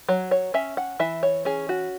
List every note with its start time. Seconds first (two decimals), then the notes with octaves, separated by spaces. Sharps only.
0.09 F#3 C#5
0.31 C#5
0.54 C#4 E5
0.77 F#5
1.00 E3 E5
1.23 C#5
1.45 C#4 G#4
1.69 F#4